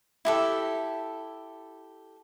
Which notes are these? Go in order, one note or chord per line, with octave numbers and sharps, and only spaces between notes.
E4 G4 A4